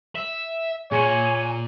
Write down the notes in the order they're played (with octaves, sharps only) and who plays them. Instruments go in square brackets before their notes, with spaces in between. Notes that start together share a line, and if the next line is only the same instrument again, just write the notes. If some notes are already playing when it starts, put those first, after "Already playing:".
[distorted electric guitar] E5
[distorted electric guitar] A#2 A#3 [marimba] G#4 [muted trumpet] C#5 [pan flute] G#5